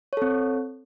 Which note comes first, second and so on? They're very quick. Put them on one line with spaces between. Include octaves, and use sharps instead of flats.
C#5 A4 C4